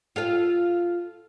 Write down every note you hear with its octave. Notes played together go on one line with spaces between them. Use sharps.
F4 A4 F5